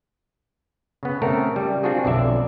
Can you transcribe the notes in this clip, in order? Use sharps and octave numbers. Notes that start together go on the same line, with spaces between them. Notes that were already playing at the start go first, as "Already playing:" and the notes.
C#3 B3
C#3 A3 C4 A4 A#4
G3
C4 D4 F4 F#4 G#4
B1 F2 D3 D5 E5